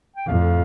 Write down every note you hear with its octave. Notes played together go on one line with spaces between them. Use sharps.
G5
F2 A2 F5